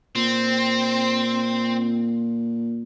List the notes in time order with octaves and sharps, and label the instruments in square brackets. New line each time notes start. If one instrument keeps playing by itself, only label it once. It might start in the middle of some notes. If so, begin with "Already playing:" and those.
[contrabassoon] A#2 [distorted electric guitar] C4